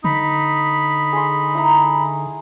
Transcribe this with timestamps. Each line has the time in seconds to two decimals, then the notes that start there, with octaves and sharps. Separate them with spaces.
0.04 D3 D#4 B5
1.13 G#4 C6
1.55 E4 A#5